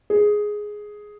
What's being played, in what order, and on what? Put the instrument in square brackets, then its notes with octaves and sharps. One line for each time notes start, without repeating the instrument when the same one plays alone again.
[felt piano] G#4